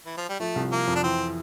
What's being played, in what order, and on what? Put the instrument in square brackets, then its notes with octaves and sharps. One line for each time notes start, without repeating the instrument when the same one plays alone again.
[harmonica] E3
F3
G3
[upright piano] F3 [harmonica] A3
[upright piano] C2
[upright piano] F3 [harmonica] A#3
[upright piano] F2
[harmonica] D4
[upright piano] E3 [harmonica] C4